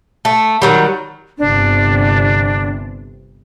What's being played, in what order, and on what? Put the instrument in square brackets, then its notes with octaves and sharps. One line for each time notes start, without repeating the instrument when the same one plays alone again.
[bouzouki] A3
D#3 F#3 G3
[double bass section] G1 C3 [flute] D4